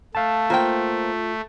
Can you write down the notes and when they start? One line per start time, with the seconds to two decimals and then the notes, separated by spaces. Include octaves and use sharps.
0.15 A3 F5 A5
0.50 A#3 F4 C5 G5